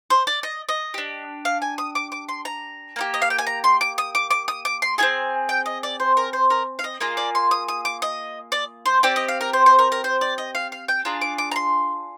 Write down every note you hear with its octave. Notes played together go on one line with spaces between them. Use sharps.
C5
D5
D#5
D#5
D4 G4
F5
G#5
D#6
D6
D6
C6
A#5
A#3 D#4 G4
D#5
F5
G5
G#5
A#5
C6
D6
D#6
D6
D6
D#6
D6
C6
C4 F4 G#4 G#5
G5
D#5
D5
C5
A#4
C5
A#4
F5
D#5
A#3 F4 G#4 D#5
D5
C6
D#6
D#6
D6
D#5
D5
C5
C4 G4 D5
D#5
F5
A#4
C5
C5
A#4
A#4
C5
D5
D#5
F5
F5
G5
D4 F4 G#4 A#5
D6
D6
A#5
C6